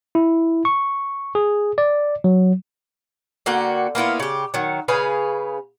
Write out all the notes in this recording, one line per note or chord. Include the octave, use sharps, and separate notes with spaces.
E4
C#6
G#4
D5
F#3
D3 A#3 F#4 G5
A#3 B3 E4 F4
C#3 G4
D#3 F#3
C#3 G#4 B4 F5